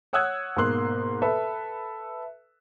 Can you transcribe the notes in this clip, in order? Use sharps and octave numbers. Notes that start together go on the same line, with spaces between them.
C#5 F#5 D#6 E6 F#6 G#6
G#2 B2 A#3 C6 F#6
A4 B4 E5